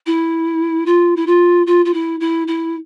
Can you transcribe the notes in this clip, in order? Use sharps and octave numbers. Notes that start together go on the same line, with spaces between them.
E4
F4
E4
F4
F4
F4
E4
E4
E4